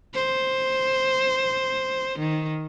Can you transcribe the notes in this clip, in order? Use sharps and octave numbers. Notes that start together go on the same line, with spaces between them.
C5
D#3